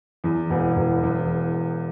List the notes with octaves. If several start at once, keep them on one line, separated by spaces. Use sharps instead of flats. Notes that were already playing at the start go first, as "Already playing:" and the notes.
E2
E1
E1
E2